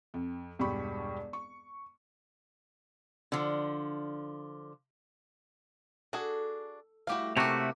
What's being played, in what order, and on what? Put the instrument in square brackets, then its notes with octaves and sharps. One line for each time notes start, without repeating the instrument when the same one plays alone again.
[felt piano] F2
E1 G2 B2 G4 B5 C#6
C#6
[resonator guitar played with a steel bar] D3 F3
[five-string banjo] D4 F#4 G#4 [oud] A4
[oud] G3 A3 E4 [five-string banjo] F#4 G4 F5
[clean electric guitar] C3 A3 F#4 [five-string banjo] A#3 G4 [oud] C#4 A4